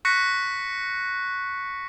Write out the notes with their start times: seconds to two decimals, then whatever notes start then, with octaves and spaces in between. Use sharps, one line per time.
0.05 C#6 F#6 A#6 B6 C#7